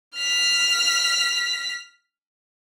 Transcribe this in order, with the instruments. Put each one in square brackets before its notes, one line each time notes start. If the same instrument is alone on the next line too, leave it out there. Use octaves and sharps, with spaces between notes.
[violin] F6 B6